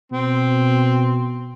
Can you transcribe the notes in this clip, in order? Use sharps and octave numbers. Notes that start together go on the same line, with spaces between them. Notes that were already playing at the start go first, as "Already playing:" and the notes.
B2 C4